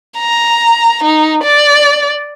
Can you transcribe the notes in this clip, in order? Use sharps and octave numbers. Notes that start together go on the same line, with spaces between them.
A#5
D#4
D5